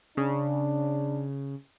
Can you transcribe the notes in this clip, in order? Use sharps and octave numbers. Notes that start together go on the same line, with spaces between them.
C#3 D4